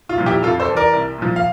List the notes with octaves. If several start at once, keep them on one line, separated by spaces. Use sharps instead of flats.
F4
A#2 F3
E4 G4
F2 F4 A4
A4 C5
E3
A#4 D5
C2
A#2 F3
F5